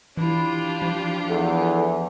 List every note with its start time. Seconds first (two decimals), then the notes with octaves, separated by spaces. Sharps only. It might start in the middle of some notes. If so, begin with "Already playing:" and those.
0.17 E3 D4 E4 F4 G4
0.82 F3
1.28 E2 A4